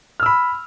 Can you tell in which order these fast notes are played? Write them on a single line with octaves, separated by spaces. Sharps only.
F6 E6 B5